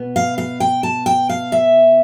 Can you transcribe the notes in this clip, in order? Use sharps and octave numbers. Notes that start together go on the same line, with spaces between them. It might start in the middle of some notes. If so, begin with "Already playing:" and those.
Already playing: B2 B3
F5
F5
G5
A5
G5
F5
E5